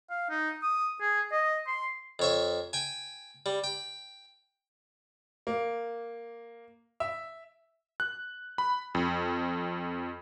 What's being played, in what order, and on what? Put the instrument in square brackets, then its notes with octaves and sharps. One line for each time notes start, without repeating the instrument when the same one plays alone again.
[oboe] F5
D#4
D#6
G#4
D#5
C6
[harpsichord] F2 C#5 E5
G5 G#5
G3
G5
[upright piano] A#3
E5
[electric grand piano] F#6
B5
F2